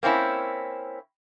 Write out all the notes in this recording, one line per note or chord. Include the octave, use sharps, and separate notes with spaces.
A#3 C4 C#4 E4